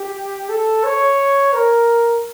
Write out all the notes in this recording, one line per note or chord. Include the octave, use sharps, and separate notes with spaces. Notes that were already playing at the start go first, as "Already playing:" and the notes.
Already playing: G4
A4
C#5
A#4